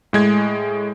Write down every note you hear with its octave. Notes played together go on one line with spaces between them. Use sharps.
A2 G#3 G#6